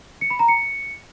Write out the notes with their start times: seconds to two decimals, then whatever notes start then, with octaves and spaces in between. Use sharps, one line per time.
0.21 C#7
0.30 B5
0.39 A#5
0.48 C#7